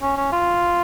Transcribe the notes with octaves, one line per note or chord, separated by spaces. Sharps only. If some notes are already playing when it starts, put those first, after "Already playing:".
C#4
C#4
F4